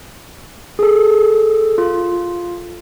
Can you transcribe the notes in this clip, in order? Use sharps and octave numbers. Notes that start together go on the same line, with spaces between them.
G#4 A4
F4